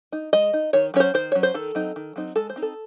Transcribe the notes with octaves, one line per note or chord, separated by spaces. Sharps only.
D#4
G#3 D#5
D#4
D#3 C#5
F#3 C#4 C#5
C5
D#3 C5
F#3 C#4 C#5
C5
D#3 A4
F#3 C4 D#4
D#3
F#3 C4 D#4
G#3 A4
C5
C4 D#4
A4